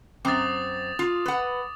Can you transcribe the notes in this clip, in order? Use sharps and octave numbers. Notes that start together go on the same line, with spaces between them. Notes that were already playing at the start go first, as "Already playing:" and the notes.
F#2 C4 D6 D#6 A6
F4
B4 F#5